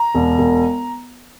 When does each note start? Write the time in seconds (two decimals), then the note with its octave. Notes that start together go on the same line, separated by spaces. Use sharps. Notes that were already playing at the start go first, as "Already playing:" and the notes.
Already playing: A#5
0.14 E1
0.38 E1